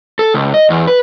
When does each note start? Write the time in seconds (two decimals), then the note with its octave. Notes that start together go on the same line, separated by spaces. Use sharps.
0.19 A4
0.34 C#2
0.54 D#5
0.70 E2
0.87 B4